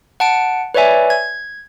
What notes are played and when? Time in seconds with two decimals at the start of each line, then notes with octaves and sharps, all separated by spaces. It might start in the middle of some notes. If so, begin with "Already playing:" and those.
0.20 F#5 A5 D7
0.74 B4 C#5 D5 E5 G#5
1.10 G#6